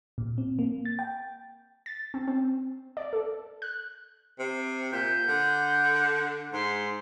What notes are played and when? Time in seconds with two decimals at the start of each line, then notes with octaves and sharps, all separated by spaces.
0.18 A#2
0.38 C4
0.59 A#3
0.85 A6
0.99 G5
1.86 A6
2.14 C4
2.28 C4
2.97 D5
3.13 A4
3.62 F#6
4.39 C3
4.92 A#2 G6
5.28 D3
6.53 G#2 C6